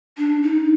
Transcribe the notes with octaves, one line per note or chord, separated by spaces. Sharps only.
D4
D#4